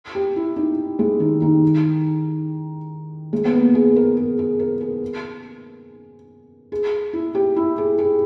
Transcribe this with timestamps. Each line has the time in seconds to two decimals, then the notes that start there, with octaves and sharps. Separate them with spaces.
0.15 G4
0.36 E4
0.56 D#4
0.99 G#3
1.20 D#3
1.42 D#3
3.33 G#3
3.45 B3
3.54 A#3
3.75 G#4
3.96 A#4
4.17 G#4
4.39 G#4
4.59 A#4
4.81 G#4
6.72 G#4
7.13 E4
7.35 G4
7.56 E4
7.78 G#4
7.99 G#4